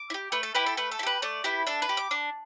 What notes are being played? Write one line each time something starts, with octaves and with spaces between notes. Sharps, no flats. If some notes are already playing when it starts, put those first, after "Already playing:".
Already playing: D6
E4
G4
A3 B4
A4
E4 G4 B4
A4
A3 B4
A4
E4
G4 B4
A3 D5
E4 G4 B4
D4 A4
B4
G4
D6
D4